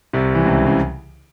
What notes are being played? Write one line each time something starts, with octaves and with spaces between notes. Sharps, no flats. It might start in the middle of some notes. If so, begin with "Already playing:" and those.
C2 C3
E3
C#2 C#3
C#3